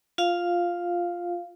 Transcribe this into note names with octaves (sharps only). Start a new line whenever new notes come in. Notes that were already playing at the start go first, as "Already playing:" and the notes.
F4 F5